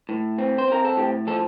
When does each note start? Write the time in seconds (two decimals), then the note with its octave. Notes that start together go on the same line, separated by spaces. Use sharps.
0.09 A2
0.38 C4
0.58 C5
0.68 C4 A#4
0.85 A4
0.97 A2 G4
1.27 F3 A4